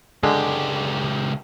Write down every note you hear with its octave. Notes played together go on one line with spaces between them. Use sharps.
C#2 D3 G#3 G4